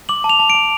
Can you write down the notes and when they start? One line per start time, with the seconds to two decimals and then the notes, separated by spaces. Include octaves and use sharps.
0.09 D6 F#7
0.24 A5
0.29 F7
0.39 A5
0.50 D7
0.55 A5